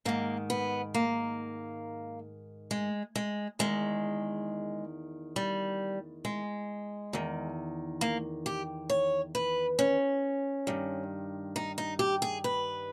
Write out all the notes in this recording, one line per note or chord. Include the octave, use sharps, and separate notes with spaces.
G#2 D#3 A#3
B3
A#3
G#3
G#3
E2 D#3 G#3
G3
G#3
E2 D#3
A#3
G4
C#5
B4
C#4
G2 D#3
D#4
D#4
G4
G#4
B4